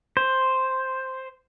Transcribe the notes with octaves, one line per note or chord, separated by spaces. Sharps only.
C5